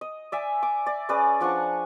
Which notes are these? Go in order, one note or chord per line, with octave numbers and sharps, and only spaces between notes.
D#5
D5 E5 G#5
D6
D5
C#4 G#4 B4 D5
F3 D4 F#5 C#6